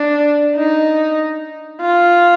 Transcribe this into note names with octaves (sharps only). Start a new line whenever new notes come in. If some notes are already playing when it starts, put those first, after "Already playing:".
Already playing: D4
D#4
F4